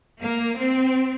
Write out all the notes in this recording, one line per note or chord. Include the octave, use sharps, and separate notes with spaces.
A#3
C4